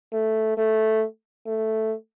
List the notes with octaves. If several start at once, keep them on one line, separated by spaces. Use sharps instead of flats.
A3
A3
A3